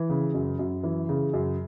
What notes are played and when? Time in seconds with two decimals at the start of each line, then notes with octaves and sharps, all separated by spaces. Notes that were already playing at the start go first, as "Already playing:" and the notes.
Already playing: E3
0.09 C#3
0.34 F#2
0.59 F#2
0.84 E3
1.09 C#3
1.33 F#2